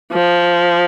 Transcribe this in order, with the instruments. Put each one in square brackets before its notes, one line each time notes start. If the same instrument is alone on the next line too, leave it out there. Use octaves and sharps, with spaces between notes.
[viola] F3